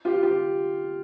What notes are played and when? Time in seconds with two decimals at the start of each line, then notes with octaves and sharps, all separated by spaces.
0.05 F4 G4
0.22 F4 G4